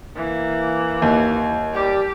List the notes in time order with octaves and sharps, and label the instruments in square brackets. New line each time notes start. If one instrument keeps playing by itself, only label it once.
[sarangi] E3 [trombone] A#3
[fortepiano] D#2
[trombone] G3 [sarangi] G4